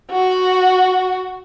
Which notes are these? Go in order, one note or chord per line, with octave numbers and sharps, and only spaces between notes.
F#4